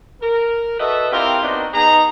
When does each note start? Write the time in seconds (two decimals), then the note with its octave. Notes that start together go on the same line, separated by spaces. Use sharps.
0.21 A#4
0.79 F#4 A4 B4 D#5 E5
1.12 C4 E4 F4 G4 A#4 D5
1.43 B3 C4 D4 D#4 F#4 A#4
1.73 B3 D#4 G#4 D#5 A#5